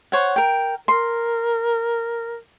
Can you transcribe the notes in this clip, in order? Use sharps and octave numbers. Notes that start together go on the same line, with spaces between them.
C5 C#5 F#5
A#4 G5
A#4 C6